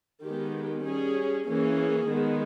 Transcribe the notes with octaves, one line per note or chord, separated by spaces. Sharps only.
D#3 G#3 B3 G4
G3 C#4 G#4
E3 A#3 C#4 G#4
D#3 G#3 B3